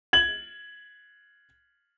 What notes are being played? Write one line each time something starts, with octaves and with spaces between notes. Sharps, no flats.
G#6 F#7